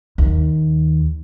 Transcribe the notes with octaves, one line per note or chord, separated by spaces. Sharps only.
D#2